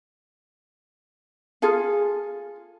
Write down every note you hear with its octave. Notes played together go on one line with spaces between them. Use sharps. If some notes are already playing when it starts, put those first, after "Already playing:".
F4 G#4 A4 F5